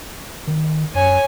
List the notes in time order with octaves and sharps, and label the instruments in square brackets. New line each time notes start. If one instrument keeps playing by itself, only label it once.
[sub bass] D#3
[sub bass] F#2 [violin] C#5 G#5